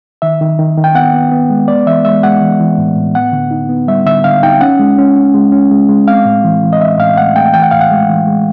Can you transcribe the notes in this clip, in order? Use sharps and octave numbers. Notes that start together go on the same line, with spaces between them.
D#3 E5
D#3
D#3
D#3
G5
B3 F#5
B3
B3
G#3
B3 D5
E3 E5
G#3 E5
G#3 F#5
E3
E3
A2
A2
B3 F#5
D3
D#4
B3
G3 E5
D3 E5
D3 F5
D#4 G5
C#4 F#5
G#3
C#4
C#4
G#3
C#4
G#3
G#3
C4 F5
A2
E3
E3
D#5
E3 E5
A2 F5
A3 F#5
A3 G5
E3 G5
F#5
A2 F5
F#5
G#3
E3
G#3